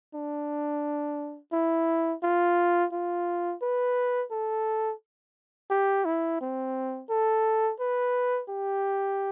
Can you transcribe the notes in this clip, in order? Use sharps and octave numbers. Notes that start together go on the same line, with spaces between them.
D4
E4
F4
F4
B4
A4
G4
E4
C4
A4
B4
G4